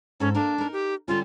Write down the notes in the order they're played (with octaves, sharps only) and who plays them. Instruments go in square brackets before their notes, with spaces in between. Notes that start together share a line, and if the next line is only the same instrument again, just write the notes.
[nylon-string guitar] G#2 A4 [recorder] C#4
[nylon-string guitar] A#3 A#4 [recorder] D4
[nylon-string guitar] D#4 A#4
[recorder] G4
[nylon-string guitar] D3 G3 C#4 [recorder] F4